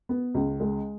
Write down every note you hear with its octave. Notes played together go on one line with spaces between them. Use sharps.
B3
C#2
G#3